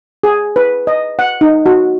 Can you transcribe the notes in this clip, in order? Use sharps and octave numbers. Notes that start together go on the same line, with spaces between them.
G#4
B4
D#5
F#5
D#4
F#4